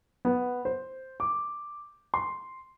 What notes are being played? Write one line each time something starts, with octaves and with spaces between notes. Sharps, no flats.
B3
C5
D6
C6